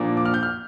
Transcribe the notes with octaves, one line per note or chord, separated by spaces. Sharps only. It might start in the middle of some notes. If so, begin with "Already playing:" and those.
Already playing: A#2 F3 A#3 D4
D6
F6
G6
F6